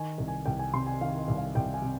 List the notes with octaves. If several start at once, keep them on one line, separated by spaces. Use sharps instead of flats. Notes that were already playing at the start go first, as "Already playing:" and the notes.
Already playing: D#3 G#5
C2
G#5
C2 G5
G#5
C3 C6
G#5
D#3 F5
D#5
C2
F5
C2 G5
G#5
C3